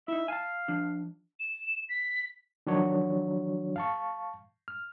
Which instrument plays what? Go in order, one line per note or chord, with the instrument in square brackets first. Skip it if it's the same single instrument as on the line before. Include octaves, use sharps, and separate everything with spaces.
[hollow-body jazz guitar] D#4 E4 [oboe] E5
[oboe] F5 [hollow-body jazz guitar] G#5 A5
[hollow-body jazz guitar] F3 D4
[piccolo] E7
B6
[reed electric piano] D#3 F3 F#3 D4 F#4 C#5
F5 A5 C#6
F6